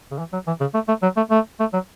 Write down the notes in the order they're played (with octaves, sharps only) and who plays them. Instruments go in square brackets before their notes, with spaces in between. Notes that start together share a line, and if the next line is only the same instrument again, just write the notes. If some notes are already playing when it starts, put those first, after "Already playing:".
[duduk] C#3
E3
F#3
E3
C#3
A3
A3
F#3
A3
A3
A3
F#3